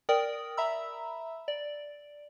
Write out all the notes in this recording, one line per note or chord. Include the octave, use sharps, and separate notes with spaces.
A#4 D5 G5 D#6
E5 A#5 B5 E6
D5